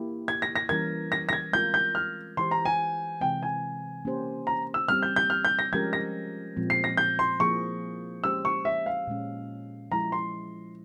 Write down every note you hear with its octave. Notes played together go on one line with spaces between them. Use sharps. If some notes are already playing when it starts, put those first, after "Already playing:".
Already playing: A#3 E4 G4
G#6
A#6
A#6
E3 G3 C#4 E4 A#4 G#6
A#6
A#6
G#6
G#3 C4 F4 A#4 G6
G6
F6
E3 G#3 E4 G4 C5 C6
A#5
G#5
C3 E3 G#3 C4 G5
G#5
A#3 C#4 G4 C5
A#5
E6
G3 C4 G4 F6
G6
G6
F6
G6
A#6
F3 G#3 C#4 G4 A#4 G#6
A#6
A#2 F3 G#3 C4
C7
A#6
G6
C6
F3 A#3 E4 G#4 C#6
G#3 C#4 G4 C5 E6
C#6
E5
F5
A#2 G#3 C#4
F3 G#3 E4 A#5
C6